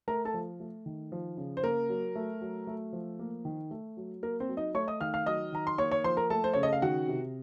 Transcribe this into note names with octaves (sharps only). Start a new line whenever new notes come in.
A3 A#4 A#5
A4 A5
F3
A3
D#3
F3
C#3
C5
A#3 A#4
F#3
A3
F#3
A3
F3
A#3
D#3
A3
F#3
A#3 A#4
C4 C5
F#3
D#4 D#5
A3 C#5 C#6
D#5 D#6
D#3 F5 F6
F5 F6
F#3 D#5 D#6
D#3 A#5
C6
A#3 C#5 C#6
C#5 C#6
F3 C5 C6
A#4 A#5
A3 A4 A5
C5
C#3 C#5
D#5
F5
D#3 F#4 F#5
C3